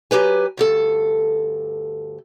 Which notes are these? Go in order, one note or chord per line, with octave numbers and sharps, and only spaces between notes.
F#3 G4 B4 G#5
D2 G2 A4